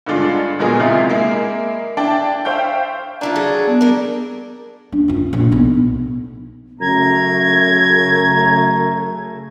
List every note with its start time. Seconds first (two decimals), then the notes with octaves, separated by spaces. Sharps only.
0.06 G2 D3 G#3 D4 F4
0.59 A#2 F#3 G#3 B3 G#4 A#4
0.80 A1 C3 G#3 E4 F4
1.09 G#3 A#3 E4
1.97 D4 E4 G5 A5
2.45 C5 E5 F5 G5 C#6 G6
3.21 A#3 D4 E4 F4
3.36 F#3 G#4 A4
3.67 B3 D4
3.81 G3 A#4
4.92 D4
5.08 F#2 F4
5.33 A#1
5.51 B1 B3
6.81 F#2 C#3 A3 A#5 G#6